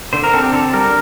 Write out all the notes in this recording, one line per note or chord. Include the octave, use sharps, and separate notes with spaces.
D3 C5
A#4
C4 A4
G4
D3 A4
G3 A#4